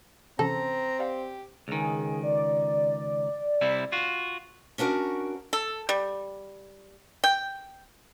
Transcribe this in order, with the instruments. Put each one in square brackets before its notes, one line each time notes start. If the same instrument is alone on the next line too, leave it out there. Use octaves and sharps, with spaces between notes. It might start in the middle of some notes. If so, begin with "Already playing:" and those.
[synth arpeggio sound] C3 E3 C#4 [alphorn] C4 [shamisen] A4 [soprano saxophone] A#5
[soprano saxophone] G4 [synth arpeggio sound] D5 F5 F#5
[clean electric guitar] C#2 D#3 [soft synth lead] G#4
[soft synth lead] D5
[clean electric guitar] C3 G3 E4
F4 F#4
[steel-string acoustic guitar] C#4 D4 F#4 A#4
[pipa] A4
G3
G5